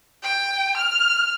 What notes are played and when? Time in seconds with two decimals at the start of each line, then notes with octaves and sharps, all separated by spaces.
0.23 G5
0.76 F6